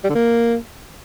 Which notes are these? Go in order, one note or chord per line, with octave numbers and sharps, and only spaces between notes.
G3
D3
A#3